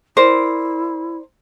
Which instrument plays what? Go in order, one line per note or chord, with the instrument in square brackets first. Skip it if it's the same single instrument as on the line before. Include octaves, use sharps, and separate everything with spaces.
[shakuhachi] E4 [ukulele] A#4 C5 D5